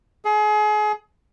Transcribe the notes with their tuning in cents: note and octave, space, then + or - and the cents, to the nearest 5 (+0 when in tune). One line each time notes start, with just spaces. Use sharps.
G#4 +30